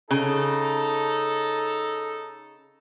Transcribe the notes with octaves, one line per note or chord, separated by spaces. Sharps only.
C#3 D#4 A4